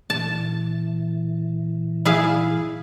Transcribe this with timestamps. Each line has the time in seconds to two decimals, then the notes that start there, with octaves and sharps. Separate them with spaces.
0.10 A#2 E3 A5
2.05 E4 G#4 F5